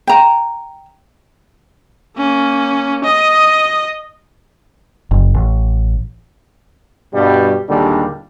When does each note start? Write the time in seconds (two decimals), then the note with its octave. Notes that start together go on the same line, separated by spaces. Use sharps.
0.07 G5 A#5
2.17 A#3 C#4
3.04 D#5 D#6
5.11 F#1
5.34 A1
7.13 G2 B2 G3
7.69 D#2 A#2 D3 G3 G#3 D4